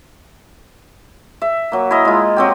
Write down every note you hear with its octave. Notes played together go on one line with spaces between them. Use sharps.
E5
F#3 A#3
E4 A#4 D#5
G#3 F4
F#3 C4 G4